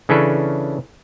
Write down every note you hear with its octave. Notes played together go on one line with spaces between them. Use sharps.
C#3 E3 C#4 D4 A4 B4